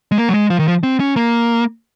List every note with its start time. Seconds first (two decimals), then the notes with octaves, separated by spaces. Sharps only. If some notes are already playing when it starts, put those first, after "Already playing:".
0.12 G#3
0.18 A#3
0.29 F#3
0.34 G#3
0.50 F3
0.59 D#3
0.68 F3
0.83 C4
1.00 C#4
1.16 A#3